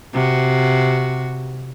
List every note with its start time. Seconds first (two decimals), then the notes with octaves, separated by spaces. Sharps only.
0.13 C3 F#4